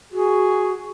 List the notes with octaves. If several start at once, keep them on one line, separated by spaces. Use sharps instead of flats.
F#4 G#4